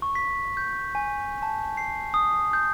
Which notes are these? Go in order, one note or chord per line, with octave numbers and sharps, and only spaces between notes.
C#6
B6
G6
G#5
A5
C7
D#6
G6